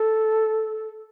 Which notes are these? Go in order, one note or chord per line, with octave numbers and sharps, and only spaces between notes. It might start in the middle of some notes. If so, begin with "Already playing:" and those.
Already playing: A4